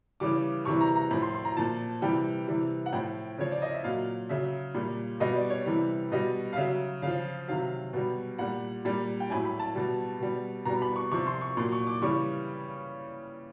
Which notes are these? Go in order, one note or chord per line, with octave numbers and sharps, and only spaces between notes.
C#3 E3 G3 D6
C3 E3 G3 C#6
A#5
A#5
A2 F3 B5
C6
C6
A#5
A#2 F3 A5
C3 E3 G3 G5
C3 E3 G3
F#5
A2 F3 G5
C#3 F3 C#5
D5
D#5
E5
A#2 F#3 F5
C#3 F#3 E5
A#2 G3
B2 G3 D#5
D5
C#5
C3 E3 G3
B2 G3 D#5
F5
C#3 F#3 E5
C#3 F3 F5
C3 D#3 F#3 F5
B2 G3
A#2 G3 F#5
A#2 G3
G5
A2 F#3 G#5
B5
A5
B2 G3
B2 G3
B2 G3 A#5
B5
C#6
C3 F3 C#6
C6
C#6
A#2 F#3 C6
C#6
D6
C#3 E3 G3 C#6